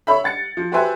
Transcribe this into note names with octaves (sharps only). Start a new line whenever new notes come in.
C#5 E5 B5
F#5 A6 C#7
F3
F#4 G4 B4 C5 E5 G#5